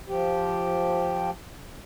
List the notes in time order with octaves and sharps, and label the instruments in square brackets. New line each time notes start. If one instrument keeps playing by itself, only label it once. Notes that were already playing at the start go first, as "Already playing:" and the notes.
[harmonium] F3 G4